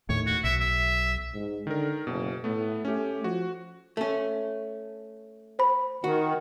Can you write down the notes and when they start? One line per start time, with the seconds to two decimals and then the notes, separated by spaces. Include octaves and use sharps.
0.09 D#2 A2 C#5
0.26 F#4
0.44 B1 E5
0.60 E5
1.34 G#2
1.67 D3 D#3 A#4
2.07 F#1 B2
2.44 A2 A3 B3
2.85 A3 C#4 G4
3.24 F3 F#4
3.97 A3 C#4
5.59 C5 B5
6.04 D#3 F#4